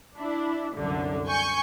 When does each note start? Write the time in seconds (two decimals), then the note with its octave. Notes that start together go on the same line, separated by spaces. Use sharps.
0.16 D4 E4
0.74 C2 F#2 D3
1.27 G#5 C#6 G6